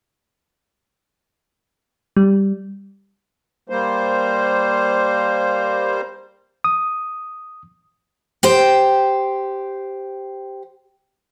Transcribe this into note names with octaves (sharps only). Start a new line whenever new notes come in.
G3
G3 A#3 C5
D#6
G4 C5 G5